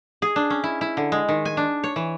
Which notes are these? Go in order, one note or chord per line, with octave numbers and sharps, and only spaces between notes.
G#4
D4
C#4
E4
E4
D3
G#3
D#3
G#5
D4
C#5
E3